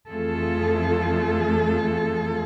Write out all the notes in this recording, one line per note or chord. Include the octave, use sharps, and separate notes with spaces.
F2 E3 A3 F4 G#4 A4